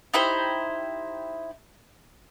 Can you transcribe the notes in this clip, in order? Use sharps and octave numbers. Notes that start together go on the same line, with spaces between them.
D#4 E4 G4 C5